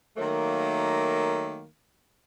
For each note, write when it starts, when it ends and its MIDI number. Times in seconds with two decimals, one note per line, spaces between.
0.17 1.64 51
0.17 1.64 54
0.17 1.64 57
0.17 1.64 58